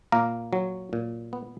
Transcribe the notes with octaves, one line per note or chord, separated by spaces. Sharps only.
A#2 A#3 A#4
F#3
A#2
B3